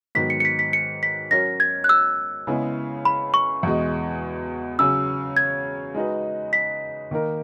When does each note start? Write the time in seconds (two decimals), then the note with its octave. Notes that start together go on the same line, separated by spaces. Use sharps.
0.15 G#2 D#3 F#3 B3 B6
0.30 C#7
0.40 C#7
0.45 B6
0.59 B6
0.73 C#7
1.03 B6
1.31 F#3 C#4 F#4 A#4 C#5 A#6
1.60 G#6
1.84 F#6
1.89 E6
2.47 C#3 G#3 B3 E4
3.05 B5
3.34 C#6
3.63 E2 B2 G#3
4.79 C#3 F#3 C#4 E6
5.37 G#6
5.95 G#3 D#4 F#4 B4
6.53 B6
7.11 D#3 A#3 D#4 A#4